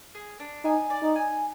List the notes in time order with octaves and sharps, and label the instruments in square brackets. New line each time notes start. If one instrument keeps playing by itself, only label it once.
[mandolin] G#4
D4
[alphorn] D#4 [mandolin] G#5
[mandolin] D5
[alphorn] D#4
[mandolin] G#5